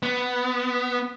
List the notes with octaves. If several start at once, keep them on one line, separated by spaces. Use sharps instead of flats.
B3